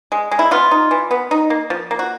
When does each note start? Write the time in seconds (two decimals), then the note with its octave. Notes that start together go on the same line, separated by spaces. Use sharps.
0.12 G#3
0.31 G#3
0.39 E4
0.51 B3 F4
0.71 D#4
0.91 E3
1.11 B3
1.31 D#4
1.50 A#3
1.70 F3
1.91 A#3
1.99 F#4